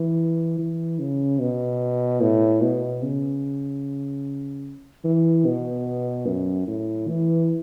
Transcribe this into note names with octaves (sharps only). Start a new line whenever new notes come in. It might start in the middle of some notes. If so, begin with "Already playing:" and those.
Already playing: E3
E3
C#3
B2
A2
B2
C#3
E3
B2
F#2
A2
E3